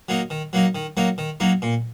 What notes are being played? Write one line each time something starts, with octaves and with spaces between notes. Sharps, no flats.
F#3 A#3 D#4
D#3
F#3 A#3 D#4
D#3
F#3 A#3 D#4
D#3
F#3 A#3 D#4
A#2